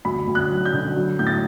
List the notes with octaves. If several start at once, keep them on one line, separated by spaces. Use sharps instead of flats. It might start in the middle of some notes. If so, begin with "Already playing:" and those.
D2 B5
D2
F#6
F#3
G6
D3
F#3
A2 G6
A6